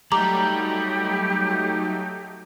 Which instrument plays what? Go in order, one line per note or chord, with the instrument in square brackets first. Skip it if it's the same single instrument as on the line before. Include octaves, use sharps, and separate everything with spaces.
[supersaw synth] F#3 A3 D#4 [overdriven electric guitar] G3 [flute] G4 [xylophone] A#5 D6